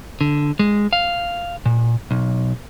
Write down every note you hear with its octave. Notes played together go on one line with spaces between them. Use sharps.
D3
G#3
F5
A#2
B1